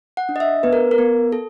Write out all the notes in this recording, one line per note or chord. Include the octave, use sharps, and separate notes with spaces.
F#5
D4
D#5
E5
B3 B4
A#4
A#4
B3
A4